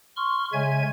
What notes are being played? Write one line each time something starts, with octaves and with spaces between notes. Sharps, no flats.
C6 C#6 F6
C#3 G#3 C#5 E5 G#5 G#6